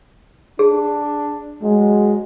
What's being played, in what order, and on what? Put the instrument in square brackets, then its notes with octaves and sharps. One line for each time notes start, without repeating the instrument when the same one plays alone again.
[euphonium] D4 [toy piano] G#4
[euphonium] F#3 [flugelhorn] G#3